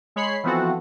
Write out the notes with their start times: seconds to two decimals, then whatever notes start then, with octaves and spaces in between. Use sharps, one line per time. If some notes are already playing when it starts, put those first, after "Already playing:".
0.16 G#3 C#5 B5 C7
0.44 E3 F3 B3 C4 F#4 A4